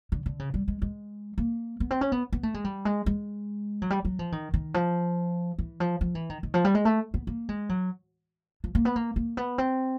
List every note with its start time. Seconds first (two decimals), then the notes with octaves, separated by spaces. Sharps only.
0.12 D3
0.26 D3
0.39 C#3
0.54 G3
0.68 G#3
0.82 G#3
1.38 A#3
1.80 B3
1.91 C4
2.01 C#4
2.12 B3
2.33 B3
2.43 A3
2.54 G#3
2.64 G3
2.85 G#3
3.06 G#3
3.82 F#3
3.90 G3
4.05 F#3
4.19 F3
4.32 D#3
4.54 D#3
4.74 F3
5.58 E3
5.80 F3
6.01 F3
6.15 E3
6.30 D#3
6.43 D#3
6.54 F3
6.65 G3
6.75 G#3
6.85 A3
7.14 B3
7.27 A#3
7.49 G#3
7.69 F#3
8.64 F3
8.75 A#3
8.85 B3
8.96 A#3
9.16 A#3
9.37 B3
9.58 C4